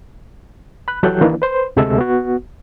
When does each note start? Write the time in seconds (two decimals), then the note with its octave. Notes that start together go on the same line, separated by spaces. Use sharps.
0.88 B5 F#6
1.03 E3 F#3 G4 A4 F#6 G6
1.21 D#3 E3 A#3 D4 E4
1.42 B4 C5
1.76 D2 C3 G#3 A4 E5 E6
1.98 B3 F#4